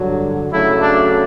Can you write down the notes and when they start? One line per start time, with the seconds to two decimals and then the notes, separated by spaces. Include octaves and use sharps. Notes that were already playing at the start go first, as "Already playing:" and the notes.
Already playing: G2 D3 F#3
0.51 C#3 F#3 A3 E4
0.80 D4